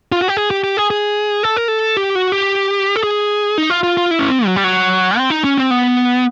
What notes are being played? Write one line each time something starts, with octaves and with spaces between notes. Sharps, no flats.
F4
F#4
G4
G#4
G4
G4
G#4
G#4
A4
A#4
A4
G4
F#4
G4
A4
G#4
D#4
F4
F4
F4
E4
C#4
C4
F#3
G3
F#3
C4
D#4
C#4
C4
B3